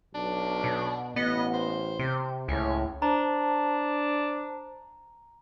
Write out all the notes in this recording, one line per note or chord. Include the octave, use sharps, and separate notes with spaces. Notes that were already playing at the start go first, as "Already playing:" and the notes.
B1 D4
B2
A1 B3 D#5
C5
C3
C#2 A2 C#4
D4 C5 A5 A#5